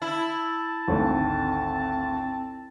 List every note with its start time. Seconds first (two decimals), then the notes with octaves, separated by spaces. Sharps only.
0.02 E4 A5
0.88 G#1 D2 C4